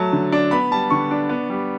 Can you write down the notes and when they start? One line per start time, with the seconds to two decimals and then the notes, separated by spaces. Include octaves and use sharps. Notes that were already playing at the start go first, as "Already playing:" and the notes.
Already playing: F#3 A3 A5
0.13 D3
0.32 D4
0.51 B3 B5
0.71 G3 A5
0.90 D3 C#6
1.11 D4
1.29 B3
1.50 G3